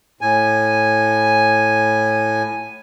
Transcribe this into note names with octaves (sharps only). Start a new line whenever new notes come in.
A2 G#5